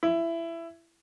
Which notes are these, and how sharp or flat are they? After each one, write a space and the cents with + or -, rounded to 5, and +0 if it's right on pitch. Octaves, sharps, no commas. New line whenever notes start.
E4 +20